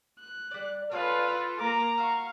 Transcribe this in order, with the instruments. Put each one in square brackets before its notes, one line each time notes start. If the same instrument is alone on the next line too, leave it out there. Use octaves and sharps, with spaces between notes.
[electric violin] F#6
[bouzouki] G3 D5
[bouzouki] D4 G#4 C#5 [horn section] F4 A4 [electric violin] B4 F5
[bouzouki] E4
[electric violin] A#3 D6 [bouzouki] F4 [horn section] A#5
[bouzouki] F#4 [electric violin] F5 C#6